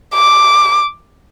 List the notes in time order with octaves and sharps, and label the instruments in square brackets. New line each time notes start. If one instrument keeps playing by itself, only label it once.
[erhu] D6